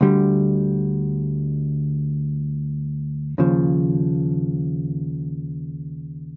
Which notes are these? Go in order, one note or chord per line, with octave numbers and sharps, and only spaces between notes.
D2 D3 G3
D#2 C#3 F3